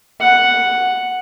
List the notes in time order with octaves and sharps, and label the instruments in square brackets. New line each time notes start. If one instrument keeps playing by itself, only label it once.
[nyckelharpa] F#5